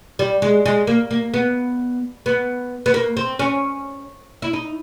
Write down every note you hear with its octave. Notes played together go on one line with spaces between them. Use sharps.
G3
G#3
G#3
A#3
A#3
B3
B3
B3
A#3
C4
C#4
E4
D#4